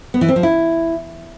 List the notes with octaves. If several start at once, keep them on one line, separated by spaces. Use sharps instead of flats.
B3
E3
C4
F3
E4